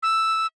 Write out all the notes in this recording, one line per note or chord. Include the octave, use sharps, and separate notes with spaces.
E6